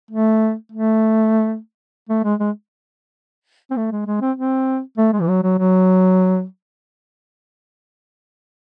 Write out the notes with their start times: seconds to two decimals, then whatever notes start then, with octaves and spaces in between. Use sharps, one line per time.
0.11 A3
0.72 A3
2.09 A3
2.24 G#3
2.40 G#3
3.70 C4
3.77 A3
3.92 G#3
4.07 G#3
4.21 C4
4.37 C4
4.98 A3
5.13 G#3
5.21 E3
5.29 F#3
5.43 F#3
5.59 F#3